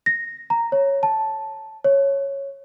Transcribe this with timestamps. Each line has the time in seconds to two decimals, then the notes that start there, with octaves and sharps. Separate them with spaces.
0.06 A#6
0.50 A#5
0.72 C#5
1.03 A5
1.84 C#5